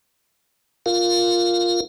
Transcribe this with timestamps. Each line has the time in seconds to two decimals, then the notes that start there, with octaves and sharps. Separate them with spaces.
0.86 F4 A#4 F5